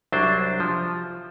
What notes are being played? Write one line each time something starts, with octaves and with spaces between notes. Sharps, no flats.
C2 F#3 D4 C5
F3